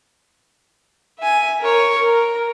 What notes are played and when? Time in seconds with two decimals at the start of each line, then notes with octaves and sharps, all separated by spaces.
1.19 E5 G#5
1.60 A#4 C#5
1.97 A#4